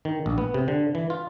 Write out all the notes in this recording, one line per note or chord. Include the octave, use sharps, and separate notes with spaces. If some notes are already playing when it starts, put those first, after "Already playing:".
D#3
A#1
B3
C3
D3
E3
F4